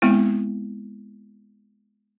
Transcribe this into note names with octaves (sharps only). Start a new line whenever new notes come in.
G#3 B3 C4 E4